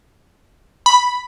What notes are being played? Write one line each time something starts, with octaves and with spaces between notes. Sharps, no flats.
B5